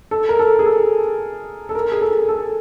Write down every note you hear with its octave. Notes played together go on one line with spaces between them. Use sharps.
A4
A#4
A4
G#4
A4
A4
A#4
G#4
A4
A4